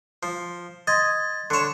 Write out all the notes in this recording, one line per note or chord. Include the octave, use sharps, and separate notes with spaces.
F3
D#5 C6 G#6 A6
D3 C#5 C6 E7